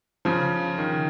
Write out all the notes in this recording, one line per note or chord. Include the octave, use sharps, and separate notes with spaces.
C#3 F3
D#3